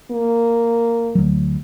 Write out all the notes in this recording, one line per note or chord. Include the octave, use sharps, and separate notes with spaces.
A#3
D2 F#3